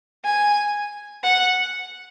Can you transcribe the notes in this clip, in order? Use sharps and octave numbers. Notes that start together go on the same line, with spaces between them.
G#5
F#5